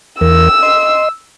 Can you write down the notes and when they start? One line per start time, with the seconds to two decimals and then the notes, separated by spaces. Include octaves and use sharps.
0.21 E2 E3 A#4 E6
0.62 D#5 C6